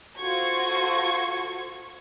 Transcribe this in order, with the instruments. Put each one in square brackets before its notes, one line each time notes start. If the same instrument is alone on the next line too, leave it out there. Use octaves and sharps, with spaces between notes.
[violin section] F4 F#4 A4 C5 C#6 G#6